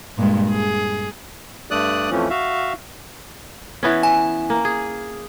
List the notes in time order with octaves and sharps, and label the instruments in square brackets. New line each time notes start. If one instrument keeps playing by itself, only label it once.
[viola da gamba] G2 A#2 G#3
G#4
[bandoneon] G2 A3 D5 D#6 F#6
F2 E3 F3 A3 C#4
F#4 E5 F5
[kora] E3 B3 C#4
[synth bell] G#5
[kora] A#3
G#4